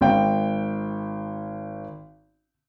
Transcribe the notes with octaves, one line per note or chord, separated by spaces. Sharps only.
G#1 G5